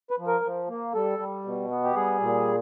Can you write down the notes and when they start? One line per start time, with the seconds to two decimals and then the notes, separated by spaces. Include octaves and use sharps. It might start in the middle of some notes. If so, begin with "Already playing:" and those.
0.11 B4
0.18 F3
0.27 A#4
0.44 F3
0.69 A#3
0.94 G3 A4
1.19 G3
1.45 B2
1.71 B3
1.84 G4
1.95 G3 G#4
2.21 A#2